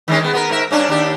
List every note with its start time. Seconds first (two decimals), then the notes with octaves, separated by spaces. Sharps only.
0.08 D#3 G#3 C#4
0.21 D#3 B3
0.33 B3 F#4 A#4
0.49 G#2 A#4 E5
0.71 G2 C#4 D4
0.89 D#2 D4 G4